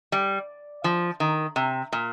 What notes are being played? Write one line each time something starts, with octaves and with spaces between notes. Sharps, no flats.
G3
F3
D#3
C3
A#2